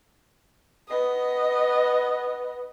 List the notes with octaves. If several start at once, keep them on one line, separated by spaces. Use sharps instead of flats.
B3 D#5